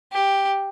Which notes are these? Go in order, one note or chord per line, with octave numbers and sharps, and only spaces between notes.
G4